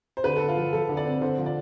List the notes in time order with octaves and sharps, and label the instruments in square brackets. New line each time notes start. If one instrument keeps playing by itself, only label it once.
[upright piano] C5
[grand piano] D3 [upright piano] B4
[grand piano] D3 [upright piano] A4
[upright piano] F4
[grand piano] F3
[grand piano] F3 [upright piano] A4
[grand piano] D3
[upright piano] D5
[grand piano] C4
[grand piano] D3 [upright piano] C5
[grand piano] F3
[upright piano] D5